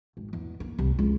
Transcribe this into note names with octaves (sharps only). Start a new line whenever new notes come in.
G#1
E2
A#3
C2
C#2